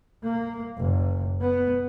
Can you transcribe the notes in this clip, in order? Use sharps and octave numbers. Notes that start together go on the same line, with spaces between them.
A#3
F#1
B3